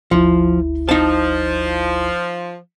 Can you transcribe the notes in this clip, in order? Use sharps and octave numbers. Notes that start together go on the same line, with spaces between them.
G1 D2 F3 E4
F3 D#4 A5